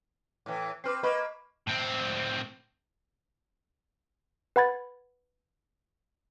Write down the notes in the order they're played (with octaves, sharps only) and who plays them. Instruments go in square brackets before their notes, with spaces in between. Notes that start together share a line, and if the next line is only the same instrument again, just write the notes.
[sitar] A2 E3
[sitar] C4 B4 [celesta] D6 F6 C7
[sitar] A#3 B4 [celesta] D#5 B5 C#6
[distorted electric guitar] A2 C4
[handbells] B4 F#5 B5 G#6 A6